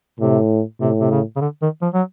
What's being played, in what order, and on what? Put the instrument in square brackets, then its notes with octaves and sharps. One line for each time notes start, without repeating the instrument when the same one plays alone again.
[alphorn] A2 [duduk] C3
[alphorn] A2 [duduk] C3
[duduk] C3
C#3
C#3
D3
D#3
F3
F#3